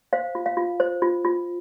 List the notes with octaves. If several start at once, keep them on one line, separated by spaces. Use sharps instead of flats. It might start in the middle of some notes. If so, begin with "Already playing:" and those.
C5 F5
F4
F5
F4
C5
F4
F4